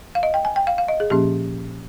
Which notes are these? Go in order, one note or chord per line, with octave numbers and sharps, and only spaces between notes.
F5
D#5
G5
G#5
G5
F5
F5
D#5
G#4
A#2 F3 A#3 C#4 G4